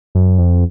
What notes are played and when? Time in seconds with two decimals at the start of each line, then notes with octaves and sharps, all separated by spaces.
0.15 F#2
0.39 F2